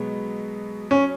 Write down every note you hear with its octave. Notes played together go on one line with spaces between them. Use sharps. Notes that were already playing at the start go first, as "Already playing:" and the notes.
Already playing: B2 F#3 G#3 B3
C#4